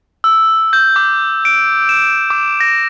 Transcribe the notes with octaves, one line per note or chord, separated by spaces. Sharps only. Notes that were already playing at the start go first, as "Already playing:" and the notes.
E6
G6
D6
D7
E7
D6
A#6